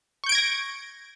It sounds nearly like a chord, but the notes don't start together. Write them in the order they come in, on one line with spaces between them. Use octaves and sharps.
C#6 G6 D7 G#6 A#6